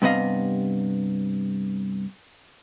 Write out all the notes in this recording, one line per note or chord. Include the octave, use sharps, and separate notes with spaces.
G2 C3 B3 D#5 F5